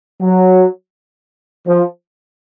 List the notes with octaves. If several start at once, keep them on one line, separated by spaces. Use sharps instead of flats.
F#3
F3